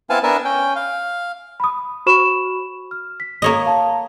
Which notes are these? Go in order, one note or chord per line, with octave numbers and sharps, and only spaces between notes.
B3 C4 E4 F5 G#5 A5
B3 D4 A#4 E5 G#5 A5
C#4 G5
F5
B5 D#6
F#4 C5 B5 C#6 E7
F6
B6
A#3 C#5 D#5
F5 A5 A#5